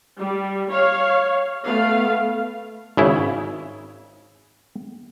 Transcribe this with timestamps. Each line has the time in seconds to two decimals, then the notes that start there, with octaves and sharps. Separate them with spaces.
0.19 G3
0.70 C#5 F5
1.65 A3 B3 F5
2.97 G#1 C#3 E4